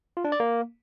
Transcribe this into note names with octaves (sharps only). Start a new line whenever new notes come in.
F4
D4
D5
A#3